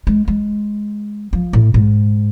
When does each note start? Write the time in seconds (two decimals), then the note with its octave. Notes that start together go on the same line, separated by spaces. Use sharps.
0.07 G#3
0.28 G#3
1.33 F3
1.53 A2
1.74 G#2